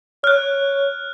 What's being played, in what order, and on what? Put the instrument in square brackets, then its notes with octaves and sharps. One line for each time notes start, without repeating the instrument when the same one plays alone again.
[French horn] C#5 [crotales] F6 F#6